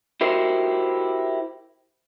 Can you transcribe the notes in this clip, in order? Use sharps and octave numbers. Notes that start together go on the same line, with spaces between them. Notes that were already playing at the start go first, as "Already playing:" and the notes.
E4 F#4 G4 A#4 C5